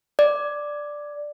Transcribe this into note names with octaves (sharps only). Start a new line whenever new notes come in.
D5